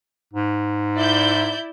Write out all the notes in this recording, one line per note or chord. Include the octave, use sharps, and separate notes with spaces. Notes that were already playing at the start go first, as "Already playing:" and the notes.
G#2
E4 D5 G6